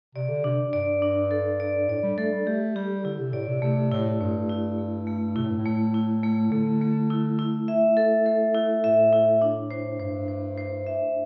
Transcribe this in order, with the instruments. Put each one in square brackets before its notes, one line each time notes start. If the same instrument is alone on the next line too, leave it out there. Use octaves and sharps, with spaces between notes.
[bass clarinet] C3 [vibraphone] D5
[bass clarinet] D3
[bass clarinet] C3 [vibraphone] D4
[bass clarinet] G2 [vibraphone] D5
[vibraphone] D4
A4
D5
[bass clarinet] A2 [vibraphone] D5
[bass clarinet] G3
[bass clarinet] A3 [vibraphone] A4
[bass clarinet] G3
[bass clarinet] A3 [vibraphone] G4
[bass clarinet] G3 [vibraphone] G4
[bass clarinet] D3 [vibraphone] E4
[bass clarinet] C3
[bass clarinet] A2 [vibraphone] D5
[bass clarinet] C3
[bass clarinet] C3 [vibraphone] A3
[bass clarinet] A2 [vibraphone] E4
[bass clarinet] G2 [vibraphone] A3
[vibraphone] E4
A3
A3
[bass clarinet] C3 [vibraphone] E4
[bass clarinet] A2
G2
A2
[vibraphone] A3
E4
A3
[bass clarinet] D3 [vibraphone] A3
[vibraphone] A3
E4
E4
E5
A4
A4
E4
[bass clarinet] A2 [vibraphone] E5
[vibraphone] E4
D4
C5
[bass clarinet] G2 [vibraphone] C5
[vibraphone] C5
C5
E5